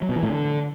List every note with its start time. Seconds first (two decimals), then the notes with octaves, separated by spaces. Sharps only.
0.02 F#3
0.09 B2
0.16 E3
0.23 A2
0.30 D3